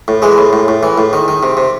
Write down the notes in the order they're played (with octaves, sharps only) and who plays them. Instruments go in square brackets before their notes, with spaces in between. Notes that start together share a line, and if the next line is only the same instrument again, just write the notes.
[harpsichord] A2
E3 G#3
A2
A2
A2
E3
A2
D#3
D#3
C3
C3